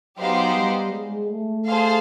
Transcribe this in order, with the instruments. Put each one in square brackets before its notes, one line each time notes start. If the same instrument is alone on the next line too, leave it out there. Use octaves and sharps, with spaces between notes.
[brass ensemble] F#3 [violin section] B3 D#4 G4 C5 F5
[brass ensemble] G3
G#3
A3
[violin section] G#4 C5 F5 A5